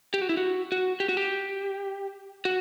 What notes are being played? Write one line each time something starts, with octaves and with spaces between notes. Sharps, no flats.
G4
F#4
E4
F#4
F#4
G4
F#4
G4
F#4